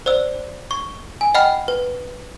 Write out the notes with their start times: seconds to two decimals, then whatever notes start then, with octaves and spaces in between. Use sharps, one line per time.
0.06 C5 D5 E6
0.71 C#6
1.21 G#5
1.34 D#5 F#5 G5 B5 F6
1.68 B4